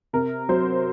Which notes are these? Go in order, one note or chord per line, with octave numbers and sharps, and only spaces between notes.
C3 A#4
F#3 C5